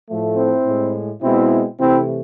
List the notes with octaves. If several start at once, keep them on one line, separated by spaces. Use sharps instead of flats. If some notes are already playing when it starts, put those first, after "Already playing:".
A2 F3 A3
C4 E4
A2 G#3
B2 G#3 C4 E4
C3 E3 A3 C4 E4